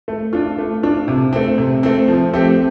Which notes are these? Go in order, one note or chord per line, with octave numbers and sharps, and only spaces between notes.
A3
D4 F4
A3
D4 F4
C3
A3 C4
C3
A3 C4
F3
A3 C4 G4